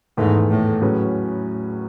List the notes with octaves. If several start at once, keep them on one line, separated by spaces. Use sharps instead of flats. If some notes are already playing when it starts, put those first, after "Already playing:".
E2 G#2 D#3 A3
A2
A2 F#3 C#4 G#4 B4